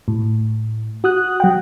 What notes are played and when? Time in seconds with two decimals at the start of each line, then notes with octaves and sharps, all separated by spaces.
0.08 A2
1.04 F#4 D#6 F#6
1.40 F#3 F#5 G5